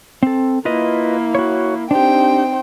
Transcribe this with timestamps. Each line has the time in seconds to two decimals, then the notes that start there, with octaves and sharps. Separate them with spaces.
0.23 C4 A4
0.65 A#3 E4 F4 B4 D#5
1.35 F#4 C#5
1.91 C4 D4 D#4 G4 C5 G5